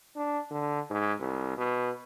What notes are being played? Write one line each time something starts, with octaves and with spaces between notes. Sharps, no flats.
D4
D3
G#2
C2
B2